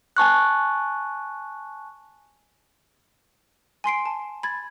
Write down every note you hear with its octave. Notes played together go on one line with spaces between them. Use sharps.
G#5 A5 C#6 F#6
G#5 C6 C7 D7
A5
B5 G#6 A6